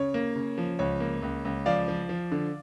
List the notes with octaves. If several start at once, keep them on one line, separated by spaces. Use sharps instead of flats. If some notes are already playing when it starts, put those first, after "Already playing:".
Already playing: C#3 C#5
A#3
C#3
F3
C#2 C#5
A#3
C#2
C#2
F3 D5 F5
F3
F3
D3